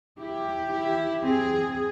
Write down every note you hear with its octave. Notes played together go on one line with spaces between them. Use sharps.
E4 G4
E4
C4 G#4